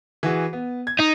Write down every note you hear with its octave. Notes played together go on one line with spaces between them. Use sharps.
E3 F#4 G#4
B3
G#6
D#4